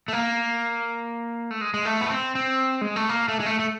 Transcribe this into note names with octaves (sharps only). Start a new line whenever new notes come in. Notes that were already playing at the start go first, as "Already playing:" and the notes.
A3
A#3
A3
G#3
G#3
A3
B3
C4
C4
G#3
A3
A#3
A3
G#3
A3
A3